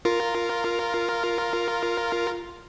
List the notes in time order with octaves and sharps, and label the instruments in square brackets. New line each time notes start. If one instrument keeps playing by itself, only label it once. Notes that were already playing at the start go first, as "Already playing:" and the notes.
[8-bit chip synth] F4 A#4